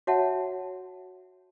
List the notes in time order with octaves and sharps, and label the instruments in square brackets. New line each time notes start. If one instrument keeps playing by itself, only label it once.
[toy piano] F#4 C#5 E5 F#5 A5